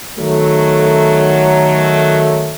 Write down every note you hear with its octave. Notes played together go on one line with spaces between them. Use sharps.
D#3 F#3 A3